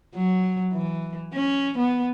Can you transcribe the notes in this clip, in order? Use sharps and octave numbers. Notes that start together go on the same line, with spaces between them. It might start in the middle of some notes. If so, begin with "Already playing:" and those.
F#3
E3
C#4
B3